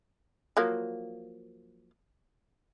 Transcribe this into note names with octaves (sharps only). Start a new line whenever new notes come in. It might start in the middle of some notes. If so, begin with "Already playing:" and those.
F3 F#3 A#3